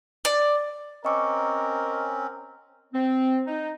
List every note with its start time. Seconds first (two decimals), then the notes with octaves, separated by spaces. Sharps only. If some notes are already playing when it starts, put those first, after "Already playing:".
0.25 D5
1.05 C4 C#4 A#4 D#5 C#6 D6
2.93 C4
3.46 D#4